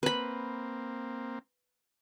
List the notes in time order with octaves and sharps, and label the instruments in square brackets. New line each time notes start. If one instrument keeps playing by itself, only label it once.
[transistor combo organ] A#3 C4 [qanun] B4 B5